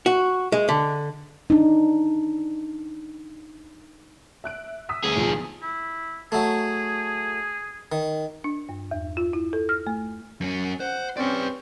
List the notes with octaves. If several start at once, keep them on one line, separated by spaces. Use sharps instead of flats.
F#4
G#3
D3
D4 D#4
E5 F#6 D7
D#6 E6 B6
D2 G#4
B1 E2 F3
E4
F#3 A3 G#4
D#3
D4
G2
E2
F4
E4
A4
F6
A3
F#2 C#4
C5 F#5
C4 C#4 B4 D5